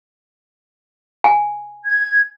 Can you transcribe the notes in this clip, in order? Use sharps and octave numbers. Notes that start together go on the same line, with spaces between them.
G#5
G#6